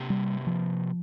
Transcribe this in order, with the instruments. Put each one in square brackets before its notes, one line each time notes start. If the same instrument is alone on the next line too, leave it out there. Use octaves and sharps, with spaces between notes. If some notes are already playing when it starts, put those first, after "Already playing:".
Already playing: [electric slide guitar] C3 A#3 G4
[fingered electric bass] G3
F3